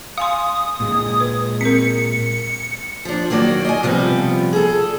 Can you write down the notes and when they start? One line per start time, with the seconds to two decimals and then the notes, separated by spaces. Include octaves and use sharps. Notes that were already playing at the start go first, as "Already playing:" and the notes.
0.18 F5 G#5 C6 D#6
0.80 A#2 G#3
1.20 B4
1.61 C4 A#4 C#7
3.05 F3 D4
3.30 D#3 F#3 A#3 F#4 D5
3.65 D#5 G#5
3.83 C3 F3 G3 B3
4.53 G#4 A4